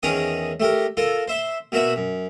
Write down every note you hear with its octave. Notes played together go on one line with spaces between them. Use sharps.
E2 D#3 C#4 G#4 A#4 D#6
A3 G4 A#4
F4 A4 A#4
C5 E5 C6
B2 A#3 F#4 E5 F#5 B5
F#2